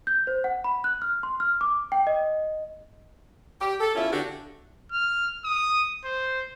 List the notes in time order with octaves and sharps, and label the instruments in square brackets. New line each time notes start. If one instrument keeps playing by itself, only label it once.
[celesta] G6
C5
F#5
B5
F#6
F6
C6
F6
D6
G5
D#5
[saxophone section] G4
A4
E2 C#4 E4 F4 E5
D3 D4 F#4 G4
[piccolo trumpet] F6
D#6
C5